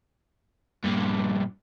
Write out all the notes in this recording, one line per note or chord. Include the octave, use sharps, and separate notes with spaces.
G2 A#2